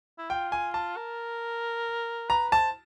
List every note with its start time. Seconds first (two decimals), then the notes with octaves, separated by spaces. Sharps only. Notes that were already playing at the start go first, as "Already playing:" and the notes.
0.18 E4
0.30 F4 G5
0.52 G#5
0.74 A5
0.96 A#4
2.30 B4 A#5
2.52 C5 A5